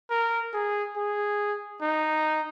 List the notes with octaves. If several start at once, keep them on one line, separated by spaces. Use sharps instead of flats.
A#4
G#4
G#4
D#4